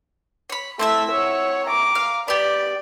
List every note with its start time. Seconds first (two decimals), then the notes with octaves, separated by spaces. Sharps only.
0.50 C#5 B5
0.79 A3 C4 E4 E5
1.12 C#5 F#5
1.66 A#5 D6
1.95 F5
2.28 B3 G4 D5